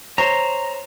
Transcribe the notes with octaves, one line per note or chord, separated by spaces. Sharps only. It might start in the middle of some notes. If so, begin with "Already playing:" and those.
C5 C#5 A#5